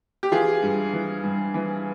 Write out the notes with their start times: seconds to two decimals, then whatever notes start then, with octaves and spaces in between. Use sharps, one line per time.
0.23 G4
0.32 E3 F4 G#4
0.63 G2
0.93 E3
1.24 G2
1.54 E3